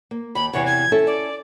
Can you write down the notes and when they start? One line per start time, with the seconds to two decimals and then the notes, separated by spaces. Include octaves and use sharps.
0.11 A#3
0.35 D#2 B5
0.53 E2 C3 E3 C#5
0.66 G#6
0.92 C#4 E4 A4
1.07 D5